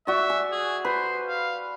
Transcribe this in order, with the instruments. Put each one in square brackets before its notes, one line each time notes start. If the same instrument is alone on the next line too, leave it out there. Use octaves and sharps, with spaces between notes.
[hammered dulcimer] F#4 D5 [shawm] E5
[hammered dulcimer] G#5
[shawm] G#4
[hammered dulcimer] B4 [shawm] C5
[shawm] F5